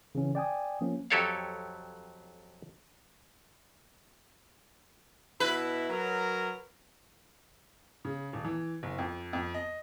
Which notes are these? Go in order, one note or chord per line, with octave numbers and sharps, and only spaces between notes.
C#3 E3 C#4
D5 G5 G#5 D#6
F3 A#3 C#4
F2 F#3 G4 A4 C#5 F5
B2 E4 B4
F#3 A#4
C#3
D#1
E3
F#1
F2
F2
D#5